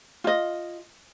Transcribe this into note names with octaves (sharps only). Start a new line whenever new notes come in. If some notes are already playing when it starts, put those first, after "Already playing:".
F4 D#5